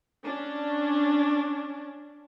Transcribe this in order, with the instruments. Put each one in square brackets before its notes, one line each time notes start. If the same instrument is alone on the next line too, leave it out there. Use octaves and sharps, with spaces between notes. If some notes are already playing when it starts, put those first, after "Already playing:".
[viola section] C#4 D4